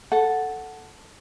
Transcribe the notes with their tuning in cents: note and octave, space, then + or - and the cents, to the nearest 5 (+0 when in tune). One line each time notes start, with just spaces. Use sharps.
A4 +0 F#5 +0